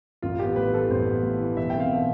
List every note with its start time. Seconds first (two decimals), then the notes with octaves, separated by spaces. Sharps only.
0.22 A1 F4
0.39 B3 G4
0.56 A2 B4
0.74 E3 A4
0.90 A1 C5
1.07 B3
1.23 A2
1.40 E3
1.57 B1 E5
1.70 C4 G5
1.80 F5
1.91 B2